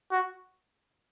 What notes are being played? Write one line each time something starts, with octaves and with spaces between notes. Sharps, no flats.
F#4